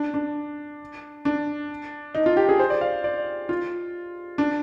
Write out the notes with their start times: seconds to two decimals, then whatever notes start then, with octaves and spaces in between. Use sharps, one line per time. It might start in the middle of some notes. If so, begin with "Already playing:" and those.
Already playing: D4
0.14 D4
1.25 D4
2.15 D#4
2.26 F4
2.37 G4
2.49 G#4
2.59 C5
2.70 D5
2.81 F5
3.04 D5
3.49 F4
4.38 D4